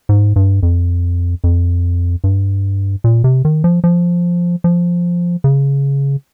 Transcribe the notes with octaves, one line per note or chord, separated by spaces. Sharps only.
G#2
G2
F2
F2
G2
A#2
C3
D#3
F3
F3
F3
C#3